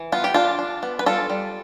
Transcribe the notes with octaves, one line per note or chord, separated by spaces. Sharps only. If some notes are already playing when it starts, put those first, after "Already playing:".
Already playing: E3
B3 F4
G4
D4 F4
D4
B3
B4
G3 F4 A4
G3